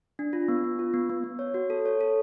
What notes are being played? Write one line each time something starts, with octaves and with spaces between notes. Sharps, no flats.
D4
F4
B3
B3
F4
B3
B3
B3
C#5
F#4
A4
C#5
A4